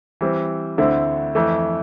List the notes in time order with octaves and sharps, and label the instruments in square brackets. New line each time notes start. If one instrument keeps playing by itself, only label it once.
[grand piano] E3 G3 C4
D2 D3 A3 C4 E4
F2 E3 A3